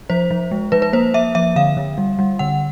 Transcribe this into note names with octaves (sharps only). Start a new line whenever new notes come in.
F3 C5
F3
G#3
F3 B4
B4
A#3 C5
A#3 E5
F3 E5
D3 F5
D3
G3
G3
D3 F#5